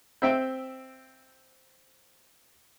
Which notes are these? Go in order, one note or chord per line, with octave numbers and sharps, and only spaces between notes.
C4 E5 G5